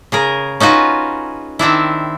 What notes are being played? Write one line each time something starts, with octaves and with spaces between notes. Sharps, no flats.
C#3 G#4 A#4
C#4 D#4 F4 F#4 B4
D#3 C4 D4 E4